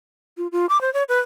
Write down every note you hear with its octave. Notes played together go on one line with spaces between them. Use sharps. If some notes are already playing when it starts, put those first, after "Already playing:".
F4
F4
D6
C5
C#5
B4